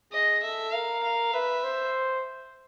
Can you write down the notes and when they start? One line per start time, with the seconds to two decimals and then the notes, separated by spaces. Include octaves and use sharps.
0.12 G#4 D#5
0.43 A4 E5
0.73 A#4 F5
1.03 F5
1.34 B4 E5
1.64 C5